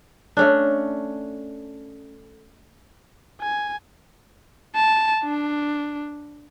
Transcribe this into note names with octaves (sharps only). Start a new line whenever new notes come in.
A3 C#4 D4
G#5
A5
D4